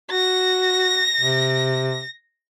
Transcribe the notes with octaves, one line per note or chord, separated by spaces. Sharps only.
F#4 A#6
C3